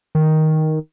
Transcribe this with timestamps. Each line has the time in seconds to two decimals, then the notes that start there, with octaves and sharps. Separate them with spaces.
0.15 D#3